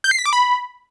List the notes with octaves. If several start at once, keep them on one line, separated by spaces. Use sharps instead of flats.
G6
C7
B6
D6
B5